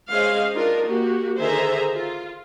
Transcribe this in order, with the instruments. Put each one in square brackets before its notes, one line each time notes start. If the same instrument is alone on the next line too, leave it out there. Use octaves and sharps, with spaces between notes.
[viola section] G#3 C#4 G#4 C5 D#5 F5
D4 D#4 F4 A#4
A#3 F#4 G4
D3 D#3 G#4 C5 E5 A#5
F4